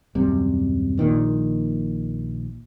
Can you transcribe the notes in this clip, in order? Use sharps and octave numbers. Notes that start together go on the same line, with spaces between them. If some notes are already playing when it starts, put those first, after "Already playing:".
D#1 F#2 C3 G3
A#1 A#2 D#3